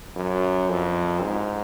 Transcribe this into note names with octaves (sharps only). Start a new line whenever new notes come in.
F#2
F2
G#2